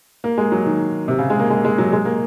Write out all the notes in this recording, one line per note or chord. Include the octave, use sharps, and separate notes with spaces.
A#3
G#3
F#3
D#3
C3
C#3
G#3
A#3
G#3
G#3
F#3
G#3
A#3